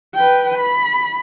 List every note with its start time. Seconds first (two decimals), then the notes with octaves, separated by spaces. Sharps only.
0.15 B4 G5
0.58 B5